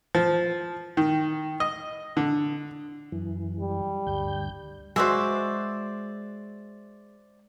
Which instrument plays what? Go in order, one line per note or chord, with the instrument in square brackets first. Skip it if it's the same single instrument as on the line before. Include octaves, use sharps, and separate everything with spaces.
[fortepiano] F3
D#3
D#5
D3
[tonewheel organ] F#2 E3
[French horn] G3
[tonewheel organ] D2 G2 G6
[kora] G#3 F#4 [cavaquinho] C5 D5 E5